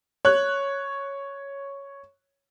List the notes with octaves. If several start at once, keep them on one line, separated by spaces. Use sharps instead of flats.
C#5 F#6